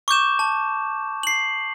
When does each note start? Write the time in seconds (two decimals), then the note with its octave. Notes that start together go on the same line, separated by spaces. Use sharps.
0.08 C#6 D6 G6 E7
0.39 A5
1.23 C7 F#7